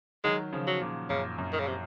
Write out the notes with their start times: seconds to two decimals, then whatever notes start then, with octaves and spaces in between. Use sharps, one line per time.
0.24 D#3 F#3 G#3
0.52 C#3 F3
0.67 F#3
0.81 A#2 C#3
1.10 F#2 A#2 C#3
1.38 F#2
1.53 D#3
1.60 C#3
1.67 C3